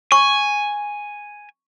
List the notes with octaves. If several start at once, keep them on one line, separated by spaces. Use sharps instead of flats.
G#5 C#6